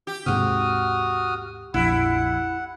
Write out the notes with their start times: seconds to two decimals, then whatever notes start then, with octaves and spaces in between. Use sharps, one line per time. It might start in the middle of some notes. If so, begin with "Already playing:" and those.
0.07 G4
0.26 D#2 G#2 C3 F#4 D#6 F6
1.74 A#1 F2 E4 F#5